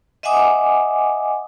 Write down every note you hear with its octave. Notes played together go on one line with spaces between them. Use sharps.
D#5 E5 F#5 G#5 D6 D#6